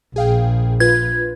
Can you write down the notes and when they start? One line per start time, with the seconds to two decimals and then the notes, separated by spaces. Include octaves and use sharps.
0.16 A#1 G#4 F5 G5
0.80 F4 B4 G#6